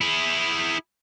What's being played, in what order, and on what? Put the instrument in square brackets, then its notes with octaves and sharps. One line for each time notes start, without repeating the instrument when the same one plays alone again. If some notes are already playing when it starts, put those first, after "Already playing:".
[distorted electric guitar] E4 G#4